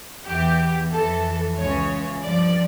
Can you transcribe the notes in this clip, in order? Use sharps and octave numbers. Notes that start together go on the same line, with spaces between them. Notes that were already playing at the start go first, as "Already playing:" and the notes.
E2 E3 G4
F2 E3 A4
C#2 C#3 E3 C#5
G2 F3 D5